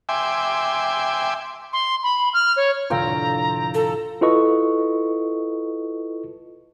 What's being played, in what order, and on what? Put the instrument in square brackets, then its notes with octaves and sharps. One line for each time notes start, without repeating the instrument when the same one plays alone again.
[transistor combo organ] E5 G5 G#5 C6 D6
[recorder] C6
B5
F6
C#5
[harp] F1 A2 D3 [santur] F4 G5 E6 [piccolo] A#5
[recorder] A4
[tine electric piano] E4 F4 A4 B4 D#5 C#6